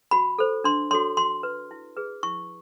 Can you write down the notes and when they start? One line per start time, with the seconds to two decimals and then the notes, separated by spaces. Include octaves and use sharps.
0.11 F#4 B5
0.39 A4 C5
0.64 D4 C6
0.91 F#4 A4 C#5 C6
1.17 F#4 C6
1.43 B4
1.71 E4
1.97 G#4 B4
2.23 E4 C#6